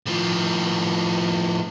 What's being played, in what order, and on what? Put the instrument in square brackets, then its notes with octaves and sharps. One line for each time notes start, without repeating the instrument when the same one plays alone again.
[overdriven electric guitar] A2 F3